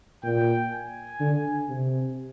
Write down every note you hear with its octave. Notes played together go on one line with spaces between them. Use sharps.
A#2 G5
G#5
D3
C3